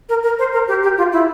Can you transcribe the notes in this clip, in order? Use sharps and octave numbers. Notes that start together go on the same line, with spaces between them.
A#4
A#4
C5
A#4
G4
G4
F4
E4